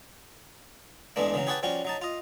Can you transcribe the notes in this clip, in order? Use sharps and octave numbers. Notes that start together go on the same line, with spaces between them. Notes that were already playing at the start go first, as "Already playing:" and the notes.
E2 G2 E3 G#3 A3 D4
C#3 E3 F#3
G4 G#4 B4 C#5 F#5 A5
F3 G3 C#4 F#4
F#3 D#4 A5
F4 D#5